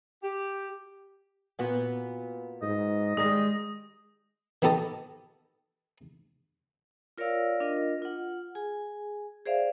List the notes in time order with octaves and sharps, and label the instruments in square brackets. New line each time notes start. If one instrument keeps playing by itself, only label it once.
[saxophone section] G4
[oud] A#2 B3 F#4
[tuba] G#2 [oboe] D#5
[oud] D#3 G3 D#4 [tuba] G#3 [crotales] D#6 A#6
[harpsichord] D#3 B3 G4 A4 D#5
[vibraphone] F4 A#4 C#5 D5 F5 E6
D4 F4 A#4 D#5
F4 F#5
G#4 G#5
G#4 C5 D5 E5 F5